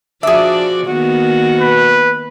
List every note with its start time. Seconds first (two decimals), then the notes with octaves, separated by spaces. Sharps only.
0.23 F3 D4 F#4 G#4 D5 E5
0.88 D#3 A#3 B3 F#4
1.60 B4